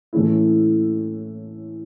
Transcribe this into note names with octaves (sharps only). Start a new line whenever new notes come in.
A2 E3 A3 C#4 E4